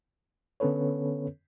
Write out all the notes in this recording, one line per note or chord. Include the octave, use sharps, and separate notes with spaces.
D3 B3 C#4 A4 B4 C#5